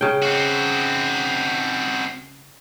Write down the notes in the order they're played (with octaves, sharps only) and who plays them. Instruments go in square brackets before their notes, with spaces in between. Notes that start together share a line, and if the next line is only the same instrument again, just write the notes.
[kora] C#3 G5
[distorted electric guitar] C4 F#4